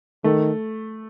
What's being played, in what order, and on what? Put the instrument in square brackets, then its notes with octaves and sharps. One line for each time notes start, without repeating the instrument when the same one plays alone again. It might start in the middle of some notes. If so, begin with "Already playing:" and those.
[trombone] D#3 [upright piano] A3